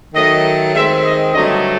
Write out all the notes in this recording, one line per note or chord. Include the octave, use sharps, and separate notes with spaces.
D#3 F#3 A3 D#5
D#3 G#3 C4 E5
D#5
G2 D3 F#3 A3 D#5